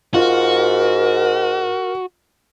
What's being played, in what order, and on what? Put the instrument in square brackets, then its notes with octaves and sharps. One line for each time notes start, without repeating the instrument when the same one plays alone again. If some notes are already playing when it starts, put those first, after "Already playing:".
[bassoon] G#2 [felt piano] F4 [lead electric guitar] F#4 [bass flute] A#4